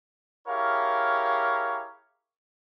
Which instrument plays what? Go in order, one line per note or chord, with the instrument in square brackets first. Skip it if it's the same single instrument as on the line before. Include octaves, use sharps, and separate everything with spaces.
[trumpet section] E4 G4 G#4 A#4 C#5 F5